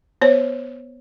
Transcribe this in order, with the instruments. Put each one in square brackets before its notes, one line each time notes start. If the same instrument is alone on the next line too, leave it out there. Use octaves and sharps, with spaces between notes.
[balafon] B3 C5 C#5